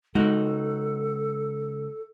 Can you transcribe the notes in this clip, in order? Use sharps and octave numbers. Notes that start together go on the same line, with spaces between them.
C#2 G#3 D#4 F#4 A4